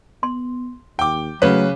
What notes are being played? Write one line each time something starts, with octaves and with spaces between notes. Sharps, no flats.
B3 C6
D#2 G5 D6
C#3 F#3 A3 B4 C#5